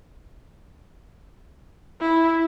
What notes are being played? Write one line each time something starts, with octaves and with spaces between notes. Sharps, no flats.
E4